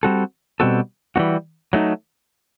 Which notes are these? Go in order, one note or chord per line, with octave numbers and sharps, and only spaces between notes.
G3 C4 F#4 A4
B2 G3 C4 F#4 A4
E3 G3 B3 D#4 F#4
F#3 A3 D#4